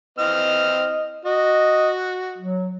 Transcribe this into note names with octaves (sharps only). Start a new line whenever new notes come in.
E3 C4 D#5 F6
F#4 D#5
F#3